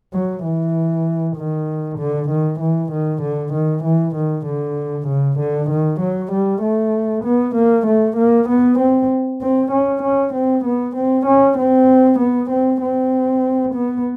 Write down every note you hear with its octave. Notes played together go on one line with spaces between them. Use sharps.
F#3
E3
D#3
D3
D#3
E3
D#3
D3
D#3
E3
D#3
D3
C#3
D3
D#3
F#3
G3
A3
B3
A#3
A3
A#3
B3
C4
C4
C#4
C#4
C4
B3
C4
C#4
C4
B3
C4
C4
B3